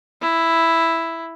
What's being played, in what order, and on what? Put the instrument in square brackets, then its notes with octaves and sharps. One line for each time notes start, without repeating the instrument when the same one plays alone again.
[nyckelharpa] E4